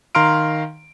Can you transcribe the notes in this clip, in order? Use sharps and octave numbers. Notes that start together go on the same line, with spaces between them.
D#3 F5 A#5 C6 F6 D7